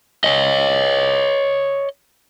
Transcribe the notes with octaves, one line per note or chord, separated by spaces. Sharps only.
C#5 D#5